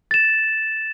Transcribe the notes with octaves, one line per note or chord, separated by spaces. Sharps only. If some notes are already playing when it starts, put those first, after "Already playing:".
A6 E7